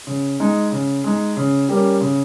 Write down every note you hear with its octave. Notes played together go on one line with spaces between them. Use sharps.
C#3
G#3 D#4
C#3
G#3 D#4
C#3
G3 A#3 C#4
C#3